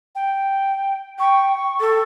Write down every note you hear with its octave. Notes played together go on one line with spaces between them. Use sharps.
G5
G5 C#6
A4